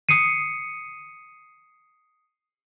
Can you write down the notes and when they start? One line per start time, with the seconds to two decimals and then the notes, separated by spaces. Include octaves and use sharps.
0.09 D#6 C7 C#7 D#7